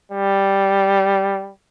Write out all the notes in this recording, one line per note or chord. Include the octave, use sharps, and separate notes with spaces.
G3